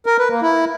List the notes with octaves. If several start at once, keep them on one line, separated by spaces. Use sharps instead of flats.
A#4
B4
A#3
E4